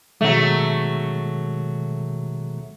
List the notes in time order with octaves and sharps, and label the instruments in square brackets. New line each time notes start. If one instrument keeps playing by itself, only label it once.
[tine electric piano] B2 D#3 G#3 [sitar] F#3 A3